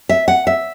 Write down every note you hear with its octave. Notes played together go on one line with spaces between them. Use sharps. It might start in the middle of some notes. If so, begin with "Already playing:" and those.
E5
F#5
E5